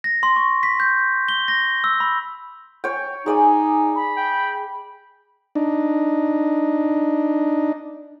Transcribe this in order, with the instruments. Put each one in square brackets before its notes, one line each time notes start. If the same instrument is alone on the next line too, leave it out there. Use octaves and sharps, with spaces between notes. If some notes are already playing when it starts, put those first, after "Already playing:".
[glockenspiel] A#6
C6
C#6
B6
G6
G7
A#6
E6
B5
[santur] C#5 G5
[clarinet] D#4 [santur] G#4 D5 G#5
[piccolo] B5
[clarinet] G5
[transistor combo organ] D4 D#4